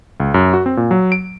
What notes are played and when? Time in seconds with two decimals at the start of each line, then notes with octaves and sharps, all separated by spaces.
0.20 C#2
0.34 F#2
0.53 F#4
0.66 C4
0.77 A#2
0.91 F#3
1.12 D7